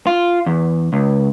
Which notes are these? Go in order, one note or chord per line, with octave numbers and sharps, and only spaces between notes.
F4
E2
C#2